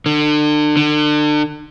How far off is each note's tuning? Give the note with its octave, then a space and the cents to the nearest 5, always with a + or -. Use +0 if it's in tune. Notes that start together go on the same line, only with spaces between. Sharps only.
D3 +35
D3 +35